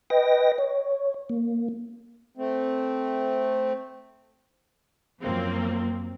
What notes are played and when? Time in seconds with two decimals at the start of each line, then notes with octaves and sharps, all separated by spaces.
0.10 B4 D#5 G5 A#6
0.58 C#5
1.30 A#3
2.37 A3 C4
5.21 F#2 F3 A#3 C4